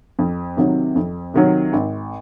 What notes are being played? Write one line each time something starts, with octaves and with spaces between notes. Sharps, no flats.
F2
C3 D#3 F#3
F2
C3 D#3 F#3
G#1